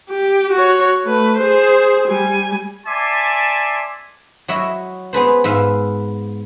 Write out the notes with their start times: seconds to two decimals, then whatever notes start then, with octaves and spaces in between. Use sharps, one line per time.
0.10 G4
0.52 F#4 C#5
1.04 A3 B4
1.38 G#4 C5
2.08 G3 G#5
2.87 D5 E5 G#5 A5 C6 D6
4.48 F#3 E4 F#4 C#5 D#5 E5
5.13 B3 G#4 B4 C5
5.44 G#2 B4 E5 F5